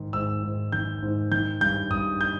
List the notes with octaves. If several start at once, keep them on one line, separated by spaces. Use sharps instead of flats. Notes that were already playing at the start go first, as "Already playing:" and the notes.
Already playing: G#2 D#3
G#2 E6
G#2
D#3 G6
G#2
D#3 G6
G2 G6
G2 D#6
G6